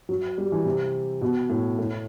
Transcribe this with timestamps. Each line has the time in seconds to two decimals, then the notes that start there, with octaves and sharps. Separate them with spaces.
0.09 F#3
0.38 G3
0.52 E3
0.65 C3
1.21 B2
1.50 A2
1.79 A2